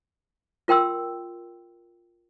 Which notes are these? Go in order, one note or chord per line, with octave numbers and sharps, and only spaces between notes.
F4 A#4 G5 C6 E6